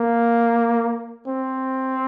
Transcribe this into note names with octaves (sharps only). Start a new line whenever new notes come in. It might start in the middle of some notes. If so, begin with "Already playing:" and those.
Already playing: A#3
C4